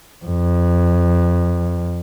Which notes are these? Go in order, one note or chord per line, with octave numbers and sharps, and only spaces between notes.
F2